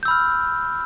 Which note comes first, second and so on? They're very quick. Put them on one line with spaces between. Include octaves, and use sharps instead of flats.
G6 E6 B5 F6